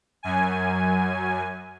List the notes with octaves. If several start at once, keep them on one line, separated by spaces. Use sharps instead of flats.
F#2 G#5